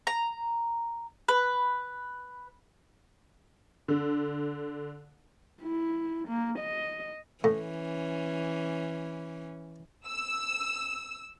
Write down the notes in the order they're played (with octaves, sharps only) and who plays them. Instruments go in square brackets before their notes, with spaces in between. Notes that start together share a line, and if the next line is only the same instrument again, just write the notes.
[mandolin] A#5
B4
[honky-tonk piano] D3
[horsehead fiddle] E4
A#3
D#5
[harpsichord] A2 [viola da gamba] E3 C#4
[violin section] E6